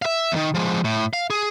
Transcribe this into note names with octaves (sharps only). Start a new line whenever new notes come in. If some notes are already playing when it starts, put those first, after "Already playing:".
E5 F5
E2 D#3
F3 G#3
A2
F5
G#4